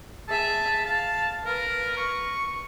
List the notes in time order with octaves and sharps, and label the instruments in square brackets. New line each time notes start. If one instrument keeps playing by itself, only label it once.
[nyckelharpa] G#4 E5 [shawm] A5
[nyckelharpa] F5 [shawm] A5
[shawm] A#4 [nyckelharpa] B4
[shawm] C#6